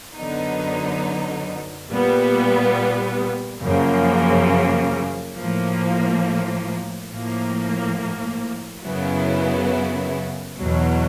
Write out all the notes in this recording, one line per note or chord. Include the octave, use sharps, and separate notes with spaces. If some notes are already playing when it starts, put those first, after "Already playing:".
F#2 D3 F#3 B3 D#4
A#2 G3 B3
F#2 C#3 F3 A#3
A2 F3 A#3
A2 F3 A#3
F#2 C#3 F#3 B3 E4
E2 B2 F#3